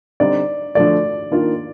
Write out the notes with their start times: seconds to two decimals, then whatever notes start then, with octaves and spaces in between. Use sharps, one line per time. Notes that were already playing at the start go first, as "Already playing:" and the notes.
0.20 D3 G3 C4 D#4 D5
0.75 D3 F3 A3 D5
1.31 D#3 A#3 D4 F4